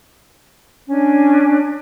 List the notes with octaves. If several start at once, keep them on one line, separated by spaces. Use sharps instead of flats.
C#4 D4